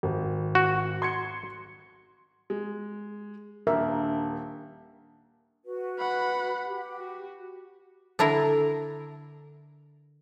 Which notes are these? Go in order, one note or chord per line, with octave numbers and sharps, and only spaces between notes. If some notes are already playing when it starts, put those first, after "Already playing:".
G#1
F#4
C6 G#6 C#7
G#3
D#1 D4 A#4 E5
F#4 B4
F#5 B5
G4
F#4
D3 D4 E4 A#4